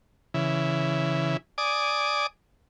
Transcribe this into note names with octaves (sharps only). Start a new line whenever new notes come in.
C#3 E3 E4
D5 G#5 D6 D#6